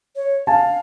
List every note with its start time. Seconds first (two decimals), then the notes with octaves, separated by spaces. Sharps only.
0.16 C#5
0.47 F5 G#5 A5